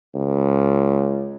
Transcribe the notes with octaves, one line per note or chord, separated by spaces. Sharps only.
C#2